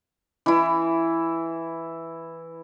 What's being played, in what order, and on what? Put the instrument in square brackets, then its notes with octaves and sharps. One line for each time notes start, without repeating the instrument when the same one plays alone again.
[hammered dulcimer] E3 E4